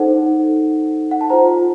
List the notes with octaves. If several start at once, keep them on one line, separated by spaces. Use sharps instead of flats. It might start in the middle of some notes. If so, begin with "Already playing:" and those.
Already playing: D#4 A4 C5 F#5
F#5
A5
F4 C5 A#5